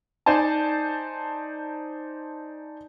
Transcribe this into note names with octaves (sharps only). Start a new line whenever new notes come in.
D#4 C5 D5 G#5 A5